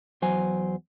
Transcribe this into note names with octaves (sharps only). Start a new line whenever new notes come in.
E2 F#3 C5 G#5